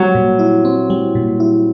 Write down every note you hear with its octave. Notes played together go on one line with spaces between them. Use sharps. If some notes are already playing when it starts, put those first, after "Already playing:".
Already playing: F#3 G3 C4
A#2
E4
C4
G3
A#2
E4